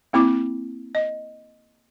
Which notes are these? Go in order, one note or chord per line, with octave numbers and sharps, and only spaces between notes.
A#3 C4 E4 D6
D#5